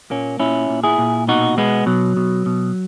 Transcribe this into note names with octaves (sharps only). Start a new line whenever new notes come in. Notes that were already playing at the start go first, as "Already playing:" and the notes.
A#2 A#3 C#4
A#2 C#4 E4
A#2
E4 G#4
A#2
B2 D#4 F#4
B2 G#3 B3
B2 F#3
B2
B2